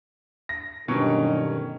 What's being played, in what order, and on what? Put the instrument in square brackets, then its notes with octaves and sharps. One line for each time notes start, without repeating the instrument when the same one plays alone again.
[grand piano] A#6
[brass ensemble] G1 D#3 [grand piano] B2 F#3 C#4